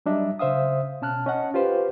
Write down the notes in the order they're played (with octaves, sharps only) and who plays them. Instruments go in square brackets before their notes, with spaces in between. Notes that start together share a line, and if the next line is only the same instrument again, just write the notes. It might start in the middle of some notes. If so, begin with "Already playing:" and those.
[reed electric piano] F#3 G3 D4 D#5 E5
C#3 C5 E5 F5 D#6
B2 C#4 A5 F6 F#6
C#4 D#5 F#5 A5
F4 G4 B4 C5 F5